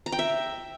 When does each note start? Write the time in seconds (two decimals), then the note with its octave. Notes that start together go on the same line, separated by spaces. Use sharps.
0.06 A#5
0.12 G5
0.19 E5